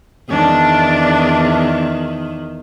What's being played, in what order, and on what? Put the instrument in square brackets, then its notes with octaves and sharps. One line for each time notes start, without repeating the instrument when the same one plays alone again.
[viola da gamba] E2 D#3 [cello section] D4